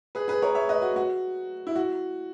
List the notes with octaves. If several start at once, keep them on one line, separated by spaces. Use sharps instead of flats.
G#4 B4
G#4 B4
A#4 C#5
C#5 E5
B4 D#5
F#4
F#4
E4
F#4